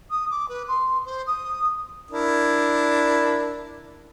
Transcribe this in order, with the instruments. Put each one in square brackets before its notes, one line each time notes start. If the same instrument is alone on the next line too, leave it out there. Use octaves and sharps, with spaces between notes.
[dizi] D#6
D6
B4
C6
C5
D#6
[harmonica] D4 E4 A#4